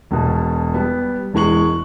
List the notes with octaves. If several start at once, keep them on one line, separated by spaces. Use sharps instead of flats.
E1 B2
G3 B3
E1 E3 G#3 C#6 F#7